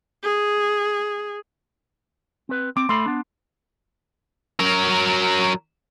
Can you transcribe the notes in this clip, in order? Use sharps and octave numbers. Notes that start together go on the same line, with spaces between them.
G#4
C4 B4
C4 D6
A3 A4 B5 C6
B3 D4
F#3 A#4